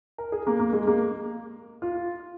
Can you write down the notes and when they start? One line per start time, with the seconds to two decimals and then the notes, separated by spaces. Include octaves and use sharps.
0.18 A#4
0.32 G#4
0.47 A#3
0.60 A#3
0.73 G#3
0.87 A#3
1.82 F4